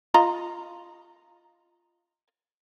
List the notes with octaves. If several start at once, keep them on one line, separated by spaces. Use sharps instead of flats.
F4 D#5 A#5